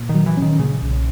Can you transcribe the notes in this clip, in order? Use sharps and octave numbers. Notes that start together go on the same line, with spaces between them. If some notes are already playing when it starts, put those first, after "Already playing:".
Already playing: A#2
D#3
F#3
E3
C#4
D#3
A#2 C#3
B1